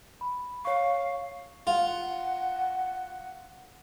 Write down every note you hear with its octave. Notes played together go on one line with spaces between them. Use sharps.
B5
C#5 F5 C#6
F4 F#5